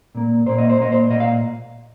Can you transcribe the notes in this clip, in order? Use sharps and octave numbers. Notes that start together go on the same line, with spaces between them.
A#2 A#3
A#2 A#3 C5
D#5
C5
A#2 A#3 D#5
C5
A#2 A#3 D#5
F5